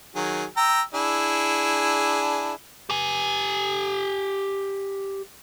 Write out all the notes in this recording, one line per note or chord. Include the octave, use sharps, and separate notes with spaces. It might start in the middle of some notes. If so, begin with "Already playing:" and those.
D#3 F#3 G#4
G5 A#5 E6
D4 E4 G#4
G4 G#5